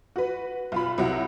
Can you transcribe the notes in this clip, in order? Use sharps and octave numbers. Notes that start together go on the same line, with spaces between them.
F#4 B4
B1 F4 B5
C2 F#3 E4 F#5